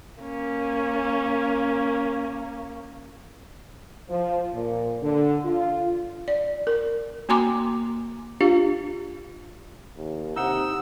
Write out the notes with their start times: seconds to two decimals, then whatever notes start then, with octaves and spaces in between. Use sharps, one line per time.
0.22 A#3 C#4
4.09 F3
4.54 A#2
5.03 D3
5.45 F4
6.28 D5
6.67 A#4
7.29 A#3 F#4 G#5 A#5 C6 D6
8.41 D4 F4 G4 F5
9.97 D#2
10.36 C3 D#4 F#5 E6